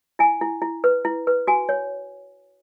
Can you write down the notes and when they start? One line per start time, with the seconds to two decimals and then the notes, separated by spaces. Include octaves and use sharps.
0.19 E4 G#5
0.41 E4
0.62 E4
0.84 B4
1.05 E4
1.27 B4
1.47 F#4 G#5
1.69 C#5